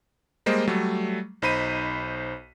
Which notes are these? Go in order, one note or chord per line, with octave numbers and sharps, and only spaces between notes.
G3 G#3 A#3 C5 D#5
F#3 G3 A3
B1 D#4 C5 B5 B6 D#7